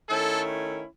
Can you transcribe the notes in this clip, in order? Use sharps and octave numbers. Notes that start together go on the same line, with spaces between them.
D#3 A3 C#4 E4 A4